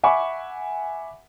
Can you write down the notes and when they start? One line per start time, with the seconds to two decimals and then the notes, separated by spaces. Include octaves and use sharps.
0.03 E5 F#5 G#5 B5 C#6 D6